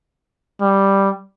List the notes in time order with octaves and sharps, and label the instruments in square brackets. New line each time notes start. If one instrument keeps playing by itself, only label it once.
[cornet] G3